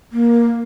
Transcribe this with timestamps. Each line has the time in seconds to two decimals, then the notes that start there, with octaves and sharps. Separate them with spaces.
0.12 A#3